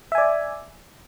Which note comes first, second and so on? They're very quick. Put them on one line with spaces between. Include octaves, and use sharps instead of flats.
E5 G#5 D5